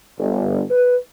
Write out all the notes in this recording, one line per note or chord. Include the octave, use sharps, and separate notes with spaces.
G1
B4